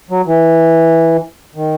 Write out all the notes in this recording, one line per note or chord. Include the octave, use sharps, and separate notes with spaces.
F#3
E3
D#3